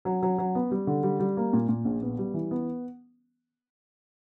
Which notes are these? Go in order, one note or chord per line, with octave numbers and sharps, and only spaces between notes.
F#3
F#3
F#3
B3
G3
D3
G3
G3
A#3
A#2
A#2
A#1
B3
G3
E3
B3